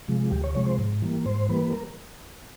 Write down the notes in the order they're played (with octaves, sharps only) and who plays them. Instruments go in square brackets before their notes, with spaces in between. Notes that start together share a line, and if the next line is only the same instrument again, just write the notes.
[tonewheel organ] C3 F3 G#3
D2 G4
C#5
C3 F3 G#3 C#5
C5
G#2
E3 G3 A#3
G#2 C5
E3 G3 A#3 B4
A#4